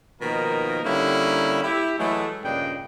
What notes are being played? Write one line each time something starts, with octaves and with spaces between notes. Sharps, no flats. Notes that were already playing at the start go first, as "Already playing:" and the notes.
B2 D#3 F3 A#3 D#4 A#4
D3 G3 A#3 C#4 D#4 E4
E4 G4
E3 F#3 G#3 A3
G2 A#2 C#3 D4 D#5 G5